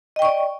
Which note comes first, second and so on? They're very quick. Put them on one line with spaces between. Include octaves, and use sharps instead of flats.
D#5 G5 C#6 D5